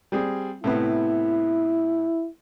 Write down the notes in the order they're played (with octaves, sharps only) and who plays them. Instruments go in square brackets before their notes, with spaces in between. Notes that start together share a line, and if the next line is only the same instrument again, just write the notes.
[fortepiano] G3 C4 G#4
[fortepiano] A2 C3 B3 [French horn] E4